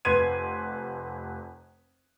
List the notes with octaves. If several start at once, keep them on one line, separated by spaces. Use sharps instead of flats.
F1 B4 C6 G#6 D#7